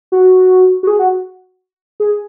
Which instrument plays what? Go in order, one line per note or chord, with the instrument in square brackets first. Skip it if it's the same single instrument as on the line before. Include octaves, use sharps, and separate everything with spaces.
[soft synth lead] F#4
F#4
G#4
F#4
G#4